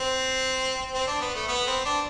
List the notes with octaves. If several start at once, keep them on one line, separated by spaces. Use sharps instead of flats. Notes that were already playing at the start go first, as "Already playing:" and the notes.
Already playing: C4
C4
D4
B3
A3
B3
C4
D4